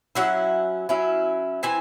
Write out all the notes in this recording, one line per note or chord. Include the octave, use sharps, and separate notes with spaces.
F#3 C#4 E4 F#5
F#3 C#4 E4
E3 C4 E4 G#5